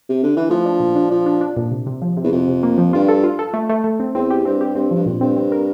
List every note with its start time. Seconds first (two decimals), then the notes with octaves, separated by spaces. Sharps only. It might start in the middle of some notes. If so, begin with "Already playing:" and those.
0.09 C3
0.23 D3
0.37 E3
0.50 F3 A3
0.65 D4
0.80 A#2
0.95 D4
1.10 F3 D4
1.26 D4
1.41 D4
1.57 A#2
1.71 C3
1.86 C3
2.02 F3
2.17 C3
2.23 E2
2.32 F2 C3
2.48 C3
2.63 A#3
2.78 F3
2.93 G2 F4
3.08 A4
3.24 F4
3.39 A4
3.54 A3
3.69 A3
3.84 A3
4.00 C4
4.14 E2 C4
4.30 G4
4.45 G2 C4
4.61 G4
4.75 G2 C4
4.91 G2 F3
5.06 F2 A#2
5.21 G2 C4
5.37 C4
5.52 A#4